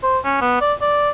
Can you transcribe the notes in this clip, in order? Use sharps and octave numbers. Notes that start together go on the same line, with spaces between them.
C5
C#4
B3
D5
D5